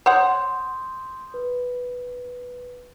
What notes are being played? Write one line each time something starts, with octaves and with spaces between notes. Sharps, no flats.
C5 C#5 F#5 C6 D#6 G6
B4